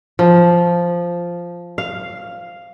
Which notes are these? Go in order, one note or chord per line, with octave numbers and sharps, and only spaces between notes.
F3
F5